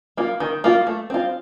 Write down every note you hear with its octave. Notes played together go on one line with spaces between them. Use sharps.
A#3 F4
D#3
A#3 F4
A3
C4 F4